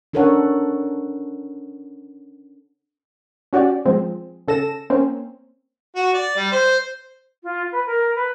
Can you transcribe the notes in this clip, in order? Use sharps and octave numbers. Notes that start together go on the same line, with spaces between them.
C#4 D4 A4 A#4 C#5 F#5
C#4 F#4 G4 D5
F3 G#3 C4
C#3 A4 A#6 E7
A#3 C4 C#4
F#4
D5
G3
C5
F4
B4
A#4
B4